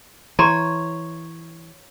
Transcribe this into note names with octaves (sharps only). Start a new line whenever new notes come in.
E3 C#5 A#5 C6